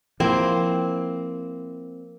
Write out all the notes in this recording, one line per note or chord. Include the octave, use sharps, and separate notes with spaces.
F3 A#3 C4 E4